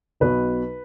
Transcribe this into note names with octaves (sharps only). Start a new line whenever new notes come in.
B1 B2 B4